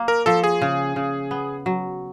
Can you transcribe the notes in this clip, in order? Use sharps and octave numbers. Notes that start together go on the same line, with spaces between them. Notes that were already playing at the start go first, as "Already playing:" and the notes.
Already playing: A#3
A#4
F3 A4
G#4
C#3
C#3
B3
F#3